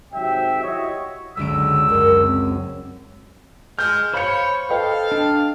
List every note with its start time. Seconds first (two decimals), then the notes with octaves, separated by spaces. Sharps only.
0.14 G#1 C3 F#3 E5 G5
0.62 E4 F#4 G4 C#5 D#5 E5
1.37 F#1 C#2 D3 E6 D7
1.90 F#2 A#4
2.22 C4
3.79 G#3 F6 G6
4.14 C5 C#5 F5 B5 G6 C#7
4.70 A4 B4 D#5 F5 G5
5.12 D4